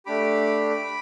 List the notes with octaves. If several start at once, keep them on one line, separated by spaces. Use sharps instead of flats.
A3 D4 G4 B5 D6